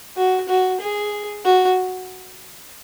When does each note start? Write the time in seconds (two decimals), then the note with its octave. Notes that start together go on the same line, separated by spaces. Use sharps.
0.17 F#4
0.48 F#4
0.80 G#4
1.45 F#4